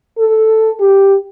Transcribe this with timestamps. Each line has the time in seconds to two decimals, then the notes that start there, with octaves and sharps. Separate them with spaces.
0.18 A4
0.80 G4